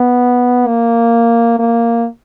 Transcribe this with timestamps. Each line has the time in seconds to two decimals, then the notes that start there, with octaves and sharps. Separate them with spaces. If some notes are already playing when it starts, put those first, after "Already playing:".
Already playing: B3
0.67 A#3
1.59 A#3